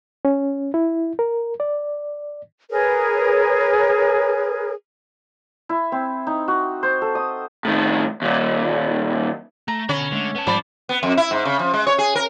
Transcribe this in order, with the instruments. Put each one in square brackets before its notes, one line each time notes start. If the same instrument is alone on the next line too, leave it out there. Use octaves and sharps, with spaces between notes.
[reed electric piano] C#4
E4
A#4
D5
[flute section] G#4 A#4 B4 C#5
[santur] E4
C4
D#4
F#4
C5
A4
D#6
[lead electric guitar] A2 D#3
D#2 A#2
[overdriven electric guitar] A3 [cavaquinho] A#5
[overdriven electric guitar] B2 B5 [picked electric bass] D3 [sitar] C#4
[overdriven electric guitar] D3 [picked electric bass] G#3 A3
[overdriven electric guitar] B3 A5
[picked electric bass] G#2 G3 [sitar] F3 [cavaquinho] D5 B5
[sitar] B3
F2
E4
G#2
C#3
F3
G#3
C#5
G#4
A#4